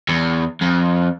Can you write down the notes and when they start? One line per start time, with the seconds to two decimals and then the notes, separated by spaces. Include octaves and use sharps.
0.09 E2
0.61 F2